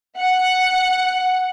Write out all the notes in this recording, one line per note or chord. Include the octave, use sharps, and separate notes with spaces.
F#5